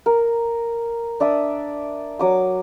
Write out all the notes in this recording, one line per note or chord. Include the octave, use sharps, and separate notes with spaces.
A#4
D4 D5 E5 D#6
F#3 D6 D#6